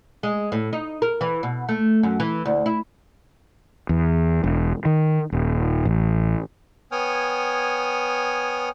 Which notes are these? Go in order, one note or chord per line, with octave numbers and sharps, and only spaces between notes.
G#3
A2
D#4
A#4
E3
B2
A3
F#2
E3
D2
E4
E2
E1
D#3
D#1
A1
B3 C#5 G5 G#5 D#6 F6